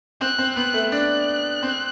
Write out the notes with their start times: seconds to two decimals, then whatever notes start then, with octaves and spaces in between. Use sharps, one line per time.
0.21 C4 F#6
0.38 C4
0.56 B3 F#6
0.74 A3
0.91 D4 F#6
1.63 C4